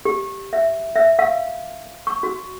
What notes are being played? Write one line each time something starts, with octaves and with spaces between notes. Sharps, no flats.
G4
E5
E5
F5
C#6
F#4